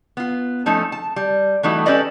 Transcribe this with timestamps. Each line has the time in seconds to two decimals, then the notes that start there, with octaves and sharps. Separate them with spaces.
0.17 B3 F4
0.66 F3 A3 C#4 D#4
0.92 A5
1.16 G3
1.63 E3 G3 A3 D#4 F#4
1.86 C#4 G4 A4 B4 D5 D#5